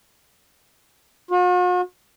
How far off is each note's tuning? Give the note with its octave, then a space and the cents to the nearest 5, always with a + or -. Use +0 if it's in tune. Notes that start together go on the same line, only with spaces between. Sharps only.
F#4 -45